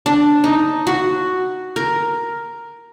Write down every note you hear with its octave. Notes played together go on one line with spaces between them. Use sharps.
D4
D#4
F#4
A#4